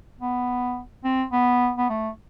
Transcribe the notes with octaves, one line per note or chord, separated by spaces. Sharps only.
B3
C4
B3
B3
A3